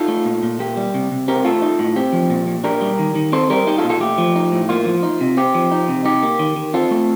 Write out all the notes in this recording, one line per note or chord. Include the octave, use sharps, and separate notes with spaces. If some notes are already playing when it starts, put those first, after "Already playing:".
Already playing: D#4 F4 A4
A3
A#2
A#2
A#3 G4
G3
C3
C3
C4 G4 A#4
A3 F4 A4
D#4
A2
C4 G4
F3
A#2
A#2
D4 G4 A#4
G3
D#3
D#3
C4 A4 C5
G3 G4 A#4
D#4 G4
F4 A4
A#2
F4 A4
A3 G4
F3
D#4
A2
A#3 F4
F3
D#4
C3
C4 G4
F3
D#4
C3
D#4 G4
A#3
D#3
D#3
C4 F4 A4
A3